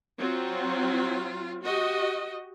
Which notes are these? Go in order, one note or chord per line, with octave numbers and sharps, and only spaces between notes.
F#3 C4 F4
F#4 G4 D#5